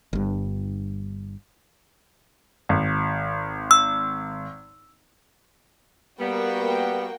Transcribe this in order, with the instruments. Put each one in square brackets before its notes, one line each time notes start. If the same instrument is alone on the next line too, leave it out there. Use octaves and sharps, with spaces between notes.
[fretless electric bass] G1 G2
[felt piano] G#1
[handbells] E6
[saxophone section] G3 B3 [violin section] A#3 F#4 G5